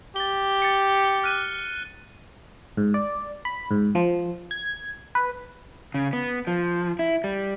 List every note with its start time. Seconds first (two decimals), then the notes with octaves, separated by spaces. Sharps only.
0.16 G4 A6 G7
0.62 A6 C#7
1.24 F6 F#6 D#7
2.77 G#2
2.94 D5
3.45 B5
3.71 G#2
3.95 F3
4.51 G#6
5.15 B4
5.94 C#3
6.13 B3
6.47 F3
6.99 E4
7.24 G3